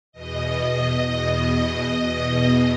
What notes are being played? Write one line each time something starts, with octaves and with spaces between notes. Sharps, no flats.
E2 B2 D#5
D#5
E2 B2 D#5
E2 B2